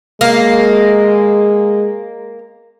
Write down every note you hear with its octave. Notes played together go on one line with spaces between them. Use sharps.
G#3 A#3